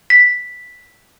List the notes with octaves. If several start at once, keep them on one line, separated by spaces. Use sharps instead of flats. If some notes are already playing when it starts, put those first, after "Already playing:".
B6